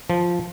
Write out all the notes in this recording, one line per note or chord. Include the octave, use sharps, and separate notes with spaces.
F3